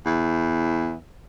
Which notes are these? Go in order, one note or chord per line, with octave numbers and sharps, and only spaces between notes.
E2